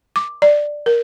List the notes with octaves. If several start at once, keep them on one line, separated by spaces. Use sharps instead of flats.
D6
D5
A#4